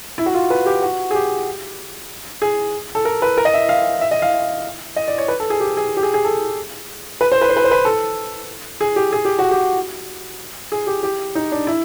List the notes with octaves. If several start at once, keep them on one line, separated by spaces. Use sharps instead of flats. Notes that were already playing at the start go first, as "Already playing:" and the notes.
E4
F#4
F4
B4
G4
F#4
G#4
G4
G#4
A4
A#4
B4
A#4
D#5
E5
F5
E5
D#5
F5
D#5
D5
C#5
B4
A4
G#4
G4
G#4
G4
G#4
G#4
A4
B4
C5
B4
C5
B4
C5
B4
A4
G#4
G4
G#4
G4
F#4
G4
G#4
G4
G4
D#4
D4
E4